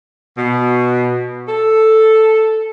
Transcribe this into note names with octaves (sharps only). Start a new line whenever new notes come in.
B2
A4